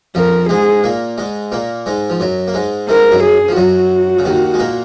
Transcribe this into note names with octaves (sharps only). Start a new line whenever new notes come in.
F2 F3 A#4
G#2 G#3 G#4
A#2 A#3
G#2 G#3
A#2 A#3
G#2 G#3
F3
F#2 F#3
A#3
G#2 G#3
G#2 G#3 A#4
F#2 F#3
G#4
F3
F#2 F#3 F#4
C#3
D#2 D#3
G#3
A#2 A#3